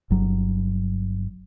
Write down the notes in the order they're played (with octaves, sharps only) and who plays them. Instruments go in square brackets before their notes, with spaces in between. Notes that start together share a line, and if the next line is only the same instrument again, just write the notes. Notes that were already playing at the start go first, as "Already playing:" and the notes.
[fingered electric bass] G1 F#3